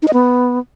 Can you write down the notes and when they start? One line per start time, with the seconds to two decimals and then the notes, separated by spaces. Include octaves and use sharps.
0.02 D#4
0.08 D#5
0.13 B3